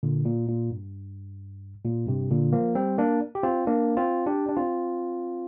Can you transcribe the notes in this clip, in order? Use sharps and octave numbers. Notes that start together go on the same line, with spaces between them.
A#2 D3
A#2
A#2
G2
A#2
G2 C3
A#2 D3
F3 A#3
G3 C4
A#3 D4
G4
C4 F4
A#3 D4
C4 F4
D4 G4
D4
C4 F4